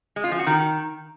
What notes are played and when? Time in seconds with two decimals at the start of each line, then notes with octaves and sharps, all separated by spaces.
0.16 G#3
0.24 F4
0.31 F3
0.39 F#4
0.47 D#3